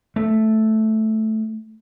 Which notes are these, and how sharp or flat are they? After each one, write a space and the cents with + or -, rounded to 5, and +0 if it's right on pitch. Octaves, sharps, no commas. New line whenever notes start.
A3 -5